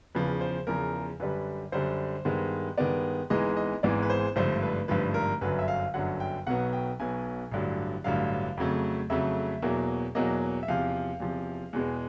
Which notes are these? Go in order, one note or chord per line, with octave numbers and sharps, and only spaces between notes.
E2 C#3 F3 B4
C5
E2 C#3 F3 A#4
F#2 D3 G3 B4
F#2 D3 G3 C5
G2 D#3 G#3 B3
G2 D#3 G#3 B3 D5
G#1 G#2 E3 G#3 B3 D#5
D#5
G#1 G#2 E3 G#3 B3 D5
B4
C5
G#1 G2 D3 F3 A3 C5
B4
G#1 G2 D3 F3 A3 B4
A#4
G1 F#2 D3 F#3 B4
E5
F5
G1 F#2 D3 F#3 F#5
G5
B1 B2 F#3 B3 F#5
G5
B1 B2 F#3 B3 G#5
A1 G2 D3 F#3
A1 G2 D3 F#3 F5
F2 C#3 F#3 A3
F2 C#3 F#3 A3 E5
E2 B2 F#3 A#3
E2 B2 F#3 A#3 D#5
E5
E2 C3 F3 F5
E2 C3 F3
E2 B2 G#3 B3